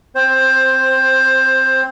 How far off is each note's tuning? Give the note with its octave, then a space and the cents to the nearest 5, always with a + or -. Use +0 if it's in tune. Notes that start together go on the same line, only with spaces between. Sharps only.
C4 +0 C5 +15